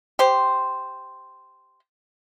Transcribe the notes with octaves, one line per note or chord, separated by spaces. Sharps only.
G4 C5